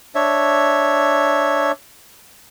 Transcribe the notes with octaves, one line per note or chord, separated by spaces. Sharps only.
D4 C#5 E5